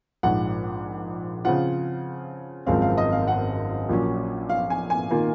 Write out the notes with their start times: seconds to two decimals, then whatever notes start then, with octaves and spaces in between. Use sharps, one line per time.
0.23 A#1 G#2 F3 F#5
1.45 C#3 F3 C4 F4 F#5
2.66 G#1 F#2 F3 G#3 C4 F5
2.82 F5
2.98 D#5
3.12 F5
3.28 F#5
3.89 A#1 A#2 F#3 C#4
4.49 F5
4.70 G#5
4.90 G#5
5.11 D#3 A#3 F4